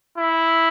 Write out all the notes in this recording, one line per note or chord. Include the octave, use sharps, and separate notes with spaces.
E4